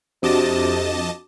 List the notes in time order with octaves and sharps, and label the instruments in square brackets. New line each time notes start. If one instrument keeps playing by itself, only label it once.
[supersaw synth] F2 D#5 A5 [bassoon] C3 [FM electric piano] D4 F#4 D6